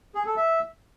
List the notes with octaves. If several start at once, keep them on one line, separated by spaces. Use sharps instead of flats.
G#4
A4
E5